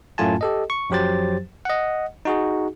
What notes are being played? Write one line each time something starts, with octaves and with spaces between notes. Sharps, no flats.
F#2 A2 A3 F4 G#5 A5
G4 A4 D#5
C#6
F#2 F3 F#3 G4 C5 A6
D#5 F#5
D#4 F#4 G#4